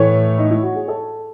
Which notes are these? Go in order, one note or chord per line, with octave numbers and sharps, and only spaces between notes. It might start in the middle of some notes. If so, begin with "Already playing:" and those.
Already playing: A2 E3 A3 C#5
D#4
E4
F#4
G#4
A4